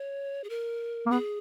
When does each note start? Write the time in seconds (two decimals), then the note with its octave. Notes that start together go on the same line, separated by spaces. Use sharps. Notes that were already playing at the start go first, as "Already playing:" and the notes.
Already playing: C#5
0.44 G#4
0.49 A#4
1.06 A#3
1.11 B3 G#4